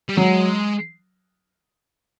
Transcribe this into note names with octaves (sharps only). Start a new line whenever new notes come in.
G3
F#3 G#3